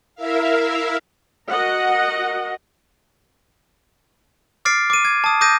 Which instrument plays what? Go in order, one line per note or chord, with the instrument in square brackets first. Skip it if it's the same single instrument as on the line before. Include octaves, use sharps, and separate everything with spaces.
[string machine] E4 A#4 E5 F5
[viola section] F#4 A#4 D#5 F#5
[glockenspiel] D6 F6 A6 C7 D7
D6 D#7
G#6
A5 D#6
D6 D#6 G6 A#6 D#7